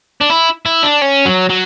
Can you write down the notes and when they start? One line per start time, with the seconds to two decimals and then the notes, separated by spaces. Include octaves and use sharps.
0.21 D4
0.30 E4
0.66 E4
0.83 D4
1.02 C#4
1.25 F#3
1.50 F#3